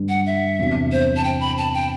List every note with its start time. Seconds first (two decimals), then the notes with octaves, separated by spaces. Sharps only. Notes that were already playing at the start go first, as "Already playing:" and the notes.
Already playing: G2 D3 G3
0.09 F#5
0.26 E5
0.59 E2 C3 F#3 B3 D4
0.92 C5
1.16 A5
1.24 G5
1.41 B5
1.58 A5
1.74 G5